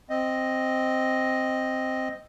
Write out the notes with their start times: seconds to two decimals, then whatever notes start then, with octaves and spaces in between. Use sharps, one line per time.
0.10 C4 D#5